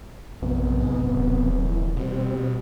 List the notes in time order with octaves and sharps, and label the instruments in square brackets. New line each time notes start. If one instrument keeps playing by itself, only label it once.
[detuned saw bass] A#1 [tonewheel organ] F#2 C3 B3
[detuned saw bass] G#2
D#1
[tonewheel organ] E3
[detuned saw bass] B2 [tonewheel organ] G3 C4